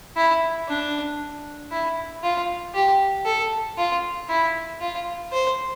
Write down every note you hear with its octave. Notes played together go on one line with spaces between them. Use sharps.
E4
D4
E4
F4
G4
A4
F4
E4
F4
C5